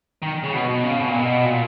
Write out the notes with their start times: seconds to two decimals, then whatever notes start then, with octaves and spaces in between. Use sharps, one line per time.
0.23 D#3
0.44 C#3
0.53 B2
0.69 B2
0.84 C#3
1.00 B2
1.09 A#2
1.19 B2
1.46 A#2